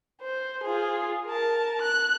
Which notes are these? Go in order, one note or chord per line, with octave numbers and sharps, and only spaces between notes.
C5
F4 G#4
A#4 A5
F#6